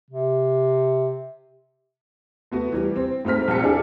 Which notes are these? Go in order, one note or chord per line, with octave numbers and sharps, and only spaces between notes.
C3
A3 B3 F#4
E3 G3
C4
G#2 A3 C4 F6 B6
A#1 C4 A5 C#7
D4 E4 G#4 A4